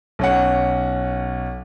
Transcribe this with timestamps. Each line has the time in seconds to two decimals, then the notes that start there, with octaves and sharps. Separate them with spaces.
0.19 B1 C#4 F#5